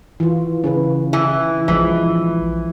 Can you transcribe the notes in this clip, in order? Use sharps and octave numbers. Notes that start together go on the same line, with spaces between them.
E3 F4
C#3 C#4 G#4 B4
E3
A#1 E3 F3 G#3